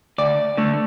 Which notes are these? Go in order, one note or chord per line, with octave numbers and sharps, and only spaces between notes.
D2 D5
D3 A3